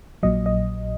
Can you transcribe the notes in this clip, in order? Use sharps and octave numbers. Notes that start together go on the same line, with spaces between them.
A#1 A#2 F#3 D#5
D#5